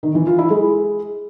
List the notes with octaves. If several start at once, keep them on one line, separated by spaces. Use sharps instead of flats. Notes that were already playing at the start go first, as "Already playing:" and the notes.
D#3
E3
F4
E4
G#3